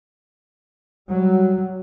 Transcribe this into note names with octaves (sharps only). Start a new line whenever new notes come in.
F#3 G3